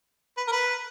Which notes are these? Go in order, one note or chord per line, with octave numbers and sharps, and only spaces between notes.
B4
A#4
B4